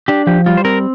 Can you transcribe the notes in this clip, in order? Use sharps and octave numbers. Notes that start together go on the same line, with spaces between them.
D4 G4
F3 G4
G3 F4
C5
C4 A#4